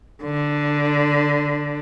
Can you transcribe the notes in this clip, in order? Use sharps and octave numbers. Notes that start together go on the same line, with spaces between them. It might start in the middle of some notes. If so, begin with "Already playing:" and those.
D3